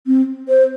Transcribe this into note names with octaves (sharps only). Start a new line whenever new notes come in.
C4
C5